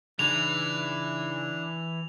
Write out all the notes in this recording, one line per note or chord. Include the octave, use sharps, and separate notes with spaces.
C#3 E3 D4 D#4 F7